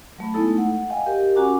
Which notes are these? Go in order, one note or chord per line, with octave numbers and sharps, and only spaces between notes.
F#3 A3 B5
G#3 A3 B3 D#4 E4 A4
F#5
D#5 F5 G5 G#5
G4 A#4 D#5
C#4 F#4 F#5 G#5 A#5 D6